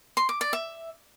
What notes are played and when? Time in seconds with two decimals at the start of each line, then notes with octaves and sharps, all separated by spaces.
0.17 C6
0.29 D6
0.41 D5
0.53 E5